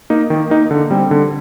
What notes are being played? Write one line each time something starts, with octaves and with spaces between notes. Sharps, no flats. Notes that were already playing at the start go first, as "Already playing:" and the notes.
A#3 D#4
D#3
A#3 D#4
D3
G3 C4
D3